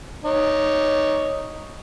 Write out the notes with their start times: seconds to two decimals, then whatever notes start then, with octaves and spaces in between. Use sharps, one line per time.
0.24 D#4 C#5